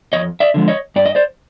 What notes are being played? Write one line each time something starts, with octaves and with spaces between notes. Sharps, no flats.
F2 C#5 D#5
D5 E5
D3 F3 G#3
C#5 D#5
G2 D5
D#5
C5 D5